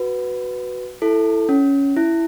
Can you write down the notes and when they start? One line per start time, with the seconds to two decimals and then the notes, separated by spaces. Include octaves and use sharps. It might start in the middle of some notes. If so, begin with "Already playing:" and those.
Already playing: F#4 B4
1.02 E4 A4
1.49 C#4
1.96 E4